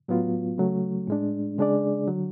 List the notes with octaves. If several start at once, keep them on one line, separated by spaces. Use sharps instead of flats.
A2 F#3 B3 F4
C#3 F#3 A3
A2 G#3 D4
C#3 G#3 D4 G#4 D5
D3 F#3